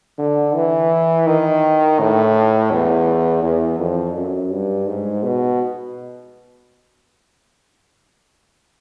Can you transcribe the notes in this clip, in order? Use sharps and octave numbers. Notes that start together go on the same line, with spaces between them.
D3
E3
D#3
A2
E2
E2
F2
F#2
G2
G#2
B2